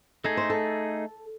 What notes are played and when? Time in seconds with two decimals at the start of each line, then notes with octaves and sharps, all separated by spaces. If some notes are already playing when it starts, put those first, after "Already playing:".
0.24 A3 D#4 G#4 A4
0.37 C5
0.50 A4